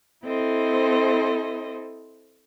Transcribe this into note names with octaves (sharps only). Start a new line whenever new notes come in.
C4 E4 A4 C5 D#5